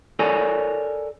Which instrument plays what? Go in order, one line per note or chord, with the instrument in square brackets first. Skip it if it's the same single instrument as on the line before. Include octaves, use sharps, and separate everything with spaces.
[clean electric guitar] A4 A#4 C#5 D5 G#5